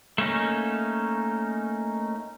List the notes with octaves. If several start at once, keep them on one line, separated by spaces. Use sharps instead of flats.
A3 A#3 C#4 D#4